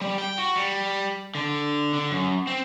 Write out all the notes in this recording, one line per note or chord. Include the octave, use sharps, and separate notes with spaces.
G3
G5
F#4
G3
D3
D3
F#2
C4